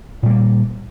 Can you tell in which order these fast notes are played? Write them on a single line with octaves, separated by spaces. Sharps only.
A#2 G3 A#3